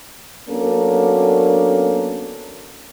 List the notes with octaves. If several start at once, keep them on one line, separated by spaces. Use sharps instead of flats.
F#3 A#3 B3 C#4 D4 A4